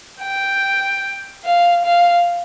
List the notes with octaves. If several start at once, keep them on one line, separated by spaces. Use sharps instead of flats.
G5
F5
F5